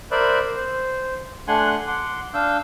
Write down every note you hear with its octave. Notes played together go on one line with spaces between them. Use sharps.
A#4 C5 D5 E5 B5 F#6
C5
A3 D4 F#5 G#5 C6 F#6
F#5 C6 D6
D4 F5 E6 G6